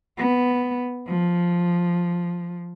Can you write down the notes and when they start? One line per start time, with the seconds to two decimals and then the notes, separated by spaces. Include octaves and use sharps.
0.17 B3
1.07 F3